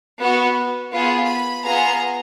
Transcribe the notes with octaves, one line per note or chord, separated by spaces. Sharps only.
B3 F#4
B3 F4 G#4
B5
B3 F4 G#4 A#5